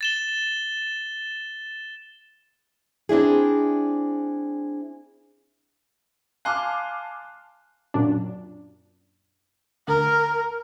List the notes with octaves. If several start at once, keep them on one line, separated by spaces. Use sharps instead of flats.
A6 E7 G7
C4 D4 E4 G#4
F5 G#5 A5 C6 D6 F6 F#6
F#2 A#2 D4
D2 A#4